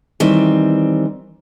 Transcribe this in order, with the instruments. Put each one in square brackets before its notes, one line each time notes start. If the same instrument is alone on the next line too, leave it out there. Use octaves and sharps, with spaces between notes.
[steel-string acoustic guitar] D#3 E3 G3 C4